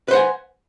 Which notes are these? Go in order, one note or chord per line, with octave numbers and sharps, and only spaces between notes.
B4 C5 F#5 G#5